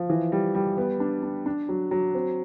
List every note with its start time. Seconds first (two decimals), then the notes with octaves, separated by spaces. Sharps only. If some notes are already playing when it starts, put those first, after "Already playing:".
Already playing: F3
0.10 E3
0.32 G3
0.55 G3
0.77 B3
1.00 D4
1.23 D4
1.46 D4
1.69 F#3
1.91 F#3
2.14 C4